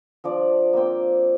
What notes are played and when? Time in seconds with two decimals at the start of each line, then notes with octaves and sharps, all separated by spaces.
0.24 F3 D4 D5
0.73 A#3 C4 G5